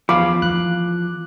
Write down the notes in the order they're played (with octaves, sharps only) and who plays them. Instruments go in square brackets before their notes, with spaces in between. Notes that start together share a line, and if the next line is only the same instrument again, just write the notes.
[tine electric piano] E2 F5 B5 [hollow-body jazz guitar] F3 [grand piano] D6
[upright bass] E2 E3 [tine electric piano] F#6